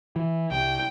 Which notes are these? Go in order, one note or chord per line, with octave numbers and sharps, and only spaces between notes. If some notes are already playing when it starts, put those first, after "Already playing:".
E3
C2 G5